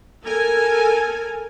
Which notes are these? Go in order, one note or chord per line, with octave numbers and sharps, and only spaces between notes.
A4 A#4 G#5